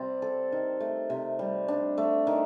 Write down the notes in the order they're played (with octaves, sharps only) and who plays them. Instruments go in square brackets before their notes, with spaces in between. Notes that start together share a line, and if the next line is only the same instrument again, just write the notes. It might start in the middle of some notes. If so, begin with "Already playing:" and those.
Already playing: [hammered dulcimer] C3 G3 C4 D5
A4
D#3
A3
C3
G3
D4
A3
D#3